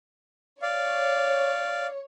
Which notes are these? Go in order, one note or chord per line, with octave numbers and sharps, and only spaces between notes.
C#5 D5 F5